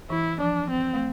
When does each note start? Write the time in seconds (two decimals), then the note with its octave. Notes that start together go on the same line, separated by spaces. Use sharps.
0.10 E3 E4
0.40 F3 D4
0.70 C4
0.94 A3